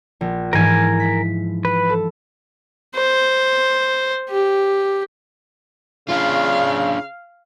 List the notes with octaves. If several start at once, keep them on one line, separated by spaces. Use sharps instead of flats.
A#1
G#2 E3 F3 A#4 G#5
B6
B4 B5
A4
C5
G4
C#3 D4 F4 F5